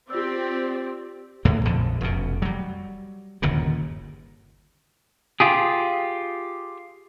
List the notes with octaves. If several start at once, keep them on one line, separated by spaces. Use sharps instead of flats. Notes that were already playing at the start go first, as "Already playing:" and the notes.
C4 F4 G4 D5 E6
E2 A2 F#3 A#3
A#1 F2 D3
F1 F#2 B2
F#3 G3
G1 D#2 A#2 C#3
F4 G4 G#4